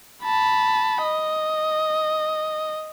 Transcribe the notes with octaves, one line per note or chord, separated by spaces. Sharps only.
A5 B5
D#5